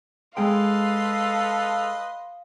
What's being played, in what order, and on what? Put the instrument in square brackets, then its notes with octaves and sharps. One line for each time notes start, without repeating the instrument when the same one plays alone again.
[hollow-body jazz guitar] G#3 G#4 G5 [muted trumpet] A4 [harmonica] B4 D#5 C6 [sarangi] F5